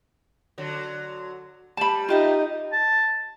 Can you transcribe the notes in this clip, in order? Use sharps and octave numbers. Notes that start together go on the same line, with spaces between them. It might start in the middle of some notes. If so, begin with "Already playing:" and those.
D3 F#3
G3 A5 B5
D#4 F4 G4 E5
A5